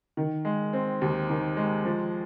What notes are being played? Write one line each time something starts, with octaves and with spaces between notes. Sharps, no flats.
D#3
G#3
C4
D#2
D#3
G#3
F3